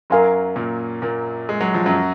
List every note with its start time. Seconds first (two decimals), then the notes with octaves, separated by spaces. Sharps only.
0.10 F#2 F#3 A#4 F5 G#5 C6
0.56 A#2 A#3
1.02 A#2 A#3
1.49 G#3
1.61 F#3
1.74 F3
1.86 F#2 F#3